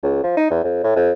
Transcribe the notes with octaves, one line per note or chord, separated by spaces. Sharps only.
C#2
F3
D#4
E2
F2
A2
F2